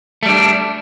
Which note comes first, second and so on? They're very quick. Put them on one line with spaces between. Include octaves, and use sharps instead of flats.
A3 G3 D4